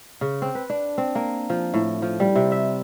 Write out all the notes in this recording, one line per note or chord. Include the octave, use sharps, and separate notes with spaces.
C#3
C4
B4
D4
C4
A#3
F3
A2
F3
G3
C3
E5